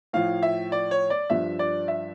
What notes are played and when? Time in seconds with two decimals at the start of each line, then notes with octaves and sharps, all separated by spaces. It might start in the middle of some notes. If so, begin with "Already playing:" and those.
0.13 A2 F3 F5
0.43 E5
0.72 D5
0.91 C#5
1.10 D5
1.30 G2 F3 E5
1.59 D5
1.88 E5